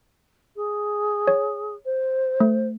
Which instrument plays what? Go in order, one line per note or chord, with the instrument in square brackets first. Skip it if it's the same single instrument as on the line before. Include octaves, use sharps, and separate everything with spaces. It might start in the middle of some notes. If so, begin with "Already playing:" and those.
[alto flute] G#4
[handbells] C#5
[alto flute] C5
[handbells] A3